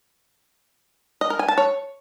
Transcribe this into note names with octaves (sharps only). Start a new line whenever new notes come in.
D#5
A#4
G#5
A5
C#5